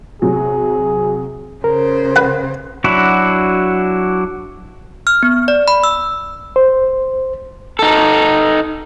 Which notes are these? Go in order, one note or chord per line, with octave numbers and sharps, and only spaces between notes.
C3 F#3 G#4
C#3 A#4 C5
B4 F#5
F#3 D4 E4 F#4
F6
B3
D5
B5
E6
C5
D#4 A4